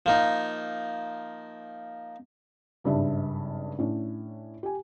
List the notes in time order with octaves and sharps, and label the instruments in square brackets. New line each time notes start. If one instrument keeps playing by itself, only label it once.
[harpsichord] F3 A#3 D#4
[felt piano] G#1 G2 C#3 D4 E5
A2 C#4 D4
G4 G#5